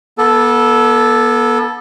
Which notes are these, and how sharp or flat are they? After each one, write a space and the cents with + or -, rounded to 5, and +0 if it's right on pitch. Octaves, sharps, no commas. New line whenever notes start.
B3 -35 A4 -5